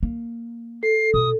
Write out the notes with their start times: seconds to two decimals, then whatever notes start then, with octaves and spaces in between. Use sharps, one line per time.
0.03 A#3
0.83 A4 C7
1.14 B2 D#6